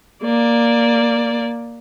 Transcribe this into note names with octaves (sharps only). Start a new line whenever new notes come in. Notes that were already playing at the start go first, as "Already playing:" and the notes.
A#3 D5